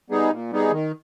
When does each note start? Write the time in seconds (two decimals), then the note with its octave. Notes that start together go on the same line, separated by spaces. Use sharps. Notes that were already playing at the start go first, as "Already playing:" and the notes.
0.10 G3 B3 D#4 G#4
0.31 A#2
0.52 G3 B3 D#4 G#4
0.71 D#3